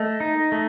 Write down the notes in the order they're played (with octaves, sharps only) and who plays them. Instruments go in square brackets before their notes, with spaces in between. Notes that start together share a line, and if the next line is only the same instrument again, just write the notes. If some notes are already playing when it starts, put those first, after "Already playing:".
Already playing: [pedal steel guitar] A3 [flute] D#5
[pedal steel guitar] D#4
A3